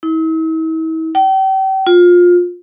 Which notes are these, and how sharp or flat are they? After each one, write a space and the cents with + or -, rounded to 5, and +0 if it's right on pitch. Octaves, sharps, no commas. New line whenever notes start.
E4 -45
G5 -35
F4 +20